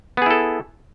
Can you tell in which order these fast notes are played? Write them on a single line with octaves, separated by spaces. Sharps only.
B3 G#4 E4 A4